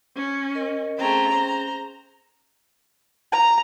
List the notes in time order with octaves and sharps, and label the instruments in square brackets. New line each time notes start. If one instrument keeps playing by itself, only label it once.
[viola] C#4
[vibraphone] A#4 D#5
[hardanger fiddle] A3 C4 [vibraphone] C#4 G#4 [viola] A#5
[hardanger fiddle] C5
[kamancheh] A#5